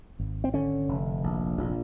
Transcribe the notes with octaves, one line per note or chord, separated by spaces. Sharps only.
G#1
C4
D3 C#4
F1
A#1
A#1